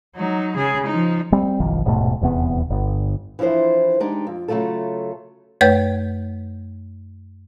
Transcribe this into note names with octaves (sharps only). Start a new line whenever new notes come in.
F#3 D#4
C#3 G#4
F3 D#4
G3 C4
F#1 B1 D#3 F3
D#1 G#2 B2 A3
D#1 E2 C3 B3
G1
E3 F3 D4 E4 C5
G#3 D4 D#4 G4
F2
C#3 F#3 A3 F4 A4
F#2 A3 B4 C#5 G6